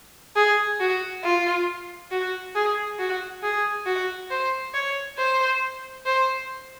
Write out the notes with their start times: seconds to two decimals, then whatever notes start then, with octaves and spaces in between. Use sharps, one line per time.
0.36 G#4
0.80 F#4
1.24 F4
2.11 F#4
2.55 G#4
2.99 F#4
3.43 G#4
3.86 F#4
4.30 C5
4.74 C#5
5.18 C5
6.06 C5